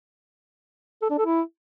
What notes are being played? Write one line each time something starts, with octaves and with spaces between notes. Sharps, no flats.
A4
D4
A4
E4